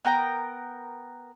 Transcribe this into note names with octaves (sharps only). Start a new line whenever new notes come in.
B3 A#4 G5 A#5